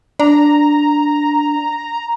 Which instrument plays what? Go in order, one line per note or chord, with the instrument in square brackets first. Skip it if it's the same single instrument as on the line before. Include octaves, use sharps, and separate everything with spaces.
[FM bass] D4 [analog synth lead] A#5